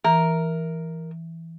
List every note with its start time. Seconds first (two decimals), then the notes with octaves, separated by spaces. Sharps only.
0.05 E3 A#4